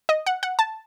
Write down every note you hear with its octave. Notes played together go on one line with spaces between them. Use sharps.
D#5
F#5
F#5
A5